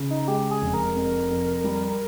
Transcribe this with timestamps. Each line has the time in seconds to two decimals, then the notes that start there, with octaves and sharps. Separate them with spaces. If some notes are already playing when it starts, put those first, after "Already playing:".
Already playing: C#3
0.10 D#4
0.28 G#3 G4
0.51 G#4
0.62 F1
0.74 A#4
0.96 F2
1.30 F2
1.64 G3